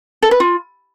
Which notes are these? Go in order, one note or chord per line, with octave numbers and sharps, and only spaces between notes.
A4
B4
F4